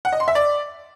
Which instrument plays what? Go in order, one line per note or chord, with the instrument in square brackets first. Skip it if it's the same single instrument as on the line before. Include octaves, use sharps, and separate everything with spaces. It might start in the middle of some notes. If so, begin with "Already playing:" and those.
[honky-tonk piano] F#5
D#5
C6
E5
D5